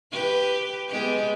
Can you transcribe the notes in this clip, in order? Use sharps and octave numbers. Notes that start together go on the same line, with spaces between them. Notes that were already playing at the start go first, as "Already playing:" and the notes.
G4 B4
G#3 B3 G4